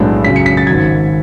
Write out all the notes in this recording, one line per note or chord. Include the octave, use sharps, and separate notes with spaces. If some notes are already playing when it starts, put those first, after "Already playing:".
Already playing: B1 A2 G#3 B3 D4
F#2 C#3 F#3 B6
C#7
B6
A6
G#1 G#2 F#3 G#6